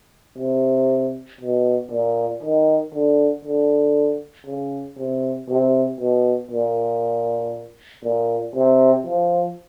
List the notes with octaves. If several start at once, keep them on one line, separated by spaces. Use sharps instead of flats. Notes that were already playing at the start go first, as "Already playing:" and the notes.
C3
B2
A#2
D#3
D3
D3
C#3
C3
C3
B2
A#2
A#2
C3
F3